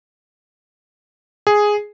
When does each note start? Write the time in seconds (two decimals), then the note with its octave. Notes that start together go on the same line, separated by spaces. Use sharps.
1.47 G#4